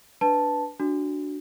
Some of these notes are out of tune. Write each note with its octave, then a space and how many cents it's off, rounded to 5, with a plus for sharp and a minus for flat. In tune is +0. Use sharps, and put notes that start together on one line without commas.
D4 +0 B4 +0 A5 +0
D4 +0 F#4 +0